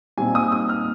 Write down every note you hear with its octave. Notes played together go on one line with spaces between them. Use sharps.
A#2 G3 C4 D#4 G#5
D#6
D#6
F6